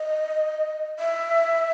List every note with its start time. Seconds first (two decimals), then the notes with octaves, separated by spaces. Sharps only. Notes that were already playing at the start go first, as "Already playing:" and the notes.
Already playing: D#5
0.99 E5